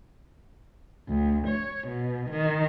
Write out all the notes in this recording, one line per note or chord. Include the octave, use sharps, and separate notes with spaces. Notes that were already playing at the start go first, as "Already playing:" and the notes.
D2
C#5
B2
D#3